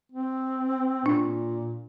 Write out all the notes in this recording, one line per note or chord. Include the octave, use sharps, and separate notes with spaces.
C4
A#2 D4